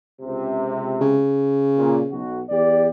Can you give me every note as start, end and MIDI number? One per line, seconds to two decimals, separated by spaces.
0.22 1.17 37
0.22 1.17 48
1.01 2.23 49
1.78 2.00 46
2.11 2.41 35
2.11 2.41 66
2.50 2.87 40
2.50 2.87 67
2.50 2.87 74